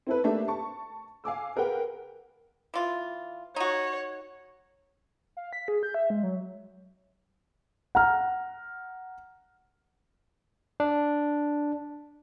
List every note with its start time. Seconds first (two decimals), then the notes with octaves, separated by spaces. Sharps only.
0.07 C4 E4 A4 B4
0.24 A3 A#3 D4 G4 E5
0.48 A5 C#6
1.24 F5 G#5 D6 E6
1.56 G#4 A#4 B4 F#5 G5
2.74 E3 F4
3.56 D#4 F#4 C#5
5.37 F5
5.53 B6
5.68 G#4
5.83 G6
5.94 E5
6.10 G#3
6.23 F#3
7.95 F#5 A#5 F6
10.80 D4